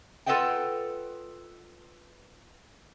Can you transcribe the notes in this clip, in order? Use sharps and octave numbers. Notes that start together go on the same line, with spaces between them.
F4 A4 B4 D#5 F#5 G5